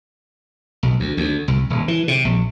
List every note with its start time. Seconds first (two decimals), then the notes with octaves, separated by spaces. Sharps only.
0.83 B1
1.00 D2
1.17 D2
1.48 C2
1.70 D#1
1.88 E3
2.08 C3
2.25 A#1